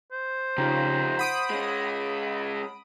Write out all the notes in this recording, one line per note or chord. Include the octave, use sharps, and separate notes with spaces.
C5
F2 C#3 D#4 F4 G4 A#5
F#5 B5 D#6 D7
G#3 C#4